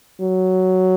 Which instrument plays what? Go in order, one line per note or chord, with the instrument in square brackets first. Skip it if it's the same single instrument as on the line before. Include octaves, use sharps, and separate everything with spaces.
[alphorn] F#3